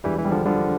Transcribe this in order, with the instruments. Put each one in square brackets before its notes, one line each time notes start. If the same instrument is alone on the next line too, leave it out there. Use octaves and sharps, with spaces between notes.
[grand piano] E1 [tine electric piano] E3 G3
[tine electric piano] E3
[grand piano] G3
[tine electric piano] D3 F3
[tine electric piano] D3 F3 [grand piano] G3